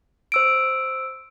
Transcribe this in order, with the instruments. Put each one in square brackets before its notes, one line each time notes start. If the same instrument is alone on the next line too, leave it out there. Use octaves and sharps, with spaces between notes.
[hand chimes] C5 E6 D7